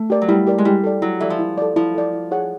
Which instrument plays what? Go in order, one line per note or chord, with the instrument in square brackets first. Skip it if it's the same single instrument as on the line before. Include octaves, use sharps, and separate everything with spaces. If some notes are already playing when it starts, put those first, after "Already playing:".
Already playing: [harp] A3
[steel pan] G4 A#4 D5
[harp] F#3
[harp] G3 [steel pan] E4
[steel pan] G4 A#4 D5
[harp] G#3
[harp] G3 [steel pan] E4
[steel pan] A4 D5
[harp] F#3 [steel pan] E4
[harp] E3 [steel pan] A4 D5
[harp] F3
[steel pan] E4
A4 D5
[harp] F3 [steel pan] E4
[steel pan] A4 D5
E4
G#4 C#5 F#5